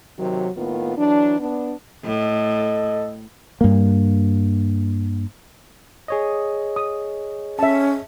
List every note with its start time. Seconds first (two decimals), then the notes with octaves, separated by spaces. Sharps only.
0.19 C3 D#3 F#3
0.56 A2 D#3 A#3 B3 F4
0.97 E3 F#3 D4
1.39 B3 D4
2.04 A2 A4 D#5
3.61 G2 A#3
6.08 G#4 C#5 D#5
6.76 D#6
7.59 C#4 E5 A5